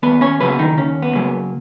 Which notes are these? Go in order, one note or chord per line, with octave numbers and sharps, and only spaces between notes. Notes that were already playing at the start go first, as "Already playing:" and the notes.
D#2 B3 B4
C#4 C#5
C#3 F#3 A#3 B3 B4
D#3 D#4
D#2 C#4
B3
C#3 F#3 A#3